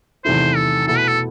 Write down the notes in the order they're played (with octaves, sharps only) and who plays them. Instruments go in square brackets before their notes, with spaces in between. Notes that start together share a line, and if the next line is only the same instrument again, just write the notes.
[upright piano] E2 C3 D#3 A3 E4 [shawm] C5
[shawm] A4
[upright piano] B2 A3 E4 [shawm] A4
[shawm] B4
A4